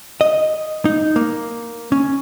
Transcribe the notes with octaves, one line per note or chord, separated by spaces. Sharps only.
D#5
D#4
A#3
C#4